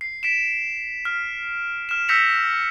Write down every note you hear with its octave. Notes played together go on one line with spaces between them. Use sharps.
C7
B6 D7 E7
F6
F6 E7
E6 G6 A#6 B6 C#7 F7